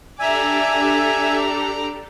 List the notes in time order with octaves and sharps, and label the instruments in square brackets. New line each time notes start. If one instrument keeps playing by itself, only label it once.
[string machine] D4 G4 A4 [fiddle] D5 A#5 [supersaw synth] E5 [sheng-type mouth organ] G#5